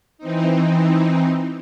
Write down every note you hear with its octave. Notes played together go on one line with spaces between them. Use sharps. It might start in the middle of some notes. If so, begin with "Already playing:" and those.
E3 C4 D#4